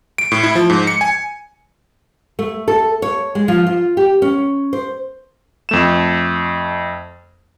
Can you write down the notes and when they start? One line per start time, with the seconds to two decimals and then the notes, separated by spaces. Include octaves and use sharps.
0.18 D7
0.32 A2
0.43 E4
0.55 F3
0.70 G#2
0.87 C#7
1.01 G#5
2.39 A3
2.68 A4
3.02 C#5
3.35 G#3
3.48 F3
3.67 F4
3.97 G4
4.22 C#4
4.73 C5
5.69 F2 A3 E7